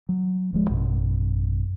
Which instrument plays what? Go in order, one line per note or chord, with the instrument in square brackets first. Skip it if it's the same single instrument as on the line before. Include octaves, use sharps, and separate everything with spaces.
[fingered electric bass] F#3
D1 F3 G#3
A1 F#2 B2